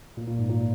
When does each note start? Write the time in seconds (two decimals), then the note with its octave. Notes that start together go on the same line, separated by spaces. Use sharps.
0.17 A#2
0.28 A#2
0.39 G#2
0.50 A#2